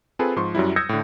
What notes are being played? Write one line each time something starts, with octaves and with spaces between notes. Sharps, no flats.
C4 F4 G#4 A4 B4
G#2 F3 C6 C#6
F#2 F#3 G3 E4
D#6 E6 G6 G#6 A#6 C#7
A2 D3